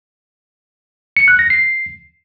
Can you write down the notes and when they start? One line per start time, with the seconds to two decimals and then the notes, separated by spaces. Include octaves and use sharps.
1.17 C#7
1.28 F#6
1.39 A#6
1.50 C7